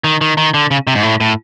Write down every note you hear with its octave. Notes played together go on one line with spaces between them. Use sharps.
D#3
D#3
D#3
D3
C#3
C3
G#2
A2
A2